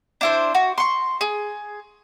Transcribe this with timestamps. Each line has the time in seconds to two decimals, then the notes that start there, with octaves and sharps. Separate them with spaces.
0.21 D4 E4 C5
0.55 F#4
0.78 C6 C#6
1.21 G#4